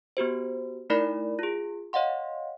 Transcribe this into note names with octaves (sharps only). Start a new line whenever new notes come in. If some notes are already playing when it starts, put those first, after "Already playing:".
B3 F#4 G4 C5
A3 D#4 E4 A#4 D5 B5
F4 G#4
C#5 D#5 F5 F#5 C6